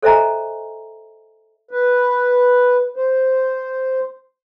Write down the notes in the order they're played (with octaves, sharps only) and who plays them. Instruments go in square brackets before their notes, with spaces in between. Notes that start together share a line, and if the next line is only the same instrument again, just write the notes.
[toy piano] A4 C5 D#5 E5 G#5 A#5
[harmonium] B4
C5